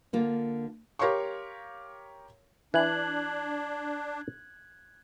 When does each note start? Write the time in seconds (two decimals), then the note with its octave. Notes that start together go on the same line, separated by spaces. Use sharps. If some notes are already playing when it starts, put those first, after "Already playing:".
0.13 D3 A#3 F4
0.99 G4 A#4 C#5 F5 C6 C#6
2.74 E3 D4 F#6 G#6 F#7